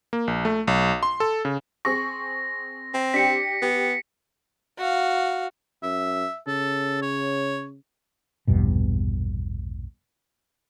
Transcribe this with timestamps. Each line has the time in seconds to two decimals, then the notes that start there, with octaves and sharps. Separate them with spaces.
0.13 A#3
0.27 A#1
0.45 A3
0.67 B1
1.03 C6
1.20 A4
1.45 C#3
1.85 C4 G#4 C#6 A#6
2.94 C4
3.14 D4 G4 G5 B6 C#7
3.62 B3 G4
4.78 F#4 F5
5.83 F#2 E5
6.47 C#3 A4
7.02 C#5
8.47 A#1 E2 G2 B2